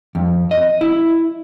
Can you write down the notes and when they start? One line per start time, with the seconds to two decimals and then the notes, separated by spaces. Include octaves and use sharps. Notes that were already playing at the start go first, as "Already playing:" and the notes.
0.15 F2
0.51 D#5
0.81 E4